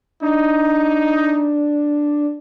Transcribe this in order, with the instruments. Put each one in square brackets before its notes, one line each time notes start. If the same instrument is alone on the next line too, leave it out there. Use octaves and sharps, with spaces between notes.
[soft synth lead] D4 [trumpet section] D#4